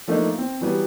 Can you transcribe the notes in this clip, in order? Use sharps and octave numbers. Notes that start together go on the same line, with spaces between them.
F3 A3 A#3 D4 D#4
C4
E3 F#3 G3 B3